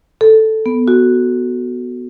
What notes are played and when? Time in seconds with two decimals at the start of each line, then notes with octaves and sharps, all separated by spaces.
0.21 A4
0.66 B3
0.88 F#4